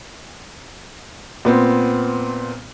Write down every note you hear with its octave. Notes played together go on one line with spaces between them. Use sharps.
A#2 B3 C4